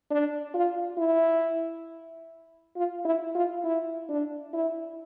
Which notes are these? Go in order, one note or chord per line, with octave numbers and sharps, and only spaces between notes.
D4
F4
E4
F4
E4
F4
E4
D4
E4